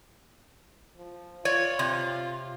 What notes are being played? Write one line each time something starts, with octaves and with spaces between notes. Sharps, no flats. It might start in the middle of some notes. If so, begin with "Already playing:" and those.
F3
F4 C#5 D5
C3